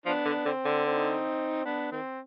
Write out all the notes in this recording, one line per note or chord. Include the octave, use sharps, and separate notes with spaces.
F3 B3 D4
D3
D3 C4
D3
C4 D#4
B3 D4
D#3 C4